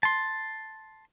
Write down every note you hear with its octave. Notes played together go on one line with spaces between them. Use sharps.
A5 C6